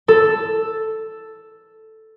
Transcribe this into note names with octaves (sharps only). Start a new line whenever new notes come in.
A4